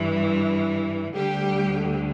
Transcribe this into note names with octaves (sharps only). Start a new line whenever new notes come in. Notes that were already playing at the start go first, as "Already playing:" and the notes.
Already playing: G2 E3
D2 D3 G3 G4